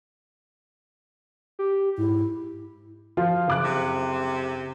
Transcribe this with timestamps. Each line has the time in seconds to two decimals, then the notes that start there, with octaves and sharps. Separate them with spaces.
1.59 G4
1.98 G#2 E4
3.17 F3 F4
3.48 F#1 D6 F#6
3.64 C3